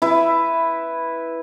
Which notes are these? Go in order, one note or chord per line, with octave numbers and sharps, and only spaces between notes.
E4 B4